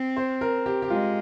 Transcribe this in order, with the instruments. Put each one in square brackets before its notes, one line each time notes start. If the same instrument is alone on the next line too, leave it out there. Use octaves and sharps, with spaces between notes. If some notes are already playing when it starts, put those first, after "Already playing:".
Already playing: [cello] C4
[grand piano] C5
A#4
G4
G4
[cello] G#3 [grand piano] F4